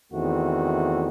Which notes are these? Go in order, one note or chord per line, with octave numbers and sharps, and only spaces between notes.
E2 D#3 A3 C4 F#4